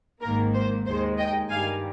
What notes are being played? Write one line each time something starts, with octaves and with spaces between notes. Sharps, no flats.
G#1 G#2 D#3 A#3 A#4
C5
D#2 D#3 G#3 C5
D#5 G5
G2 D#3 G3 F5 G#5